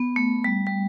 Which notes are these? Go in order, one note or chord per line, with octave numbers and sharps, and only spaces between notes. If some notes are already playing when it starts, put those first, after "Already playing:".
Already playing: B3
A3
G3
G3